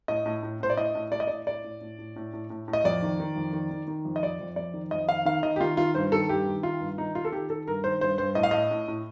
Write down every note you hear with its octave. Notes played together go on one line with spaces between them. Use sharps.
A2 D#5
A2
A2
A2 C5
D5
A2 D#5
A2
A2 D5
D#5
A2 D5
A2 D5
A2
A2
A2
A2
A2
A2
A2
D#5
F2 D5
D#3
D#3
F2
D#3
D#3
D#3
F2
D#5
F2 D5
F2
F2 D5
D#3
F2 D#5
D#3 F5
D#3 F5
D#3 D#5
G4
D#3 F4
D#3 F4
G2 C5
D#3 A4
G2 G4
D#3
D#3 F4
G2
D#3 D#4
D#3 F4
A4
D#3 G4
D#3 A4
G2 A#4
D#3 C5
G2 C5
G2 C5
A2 D#5
F5
A2 D#5
A2
A2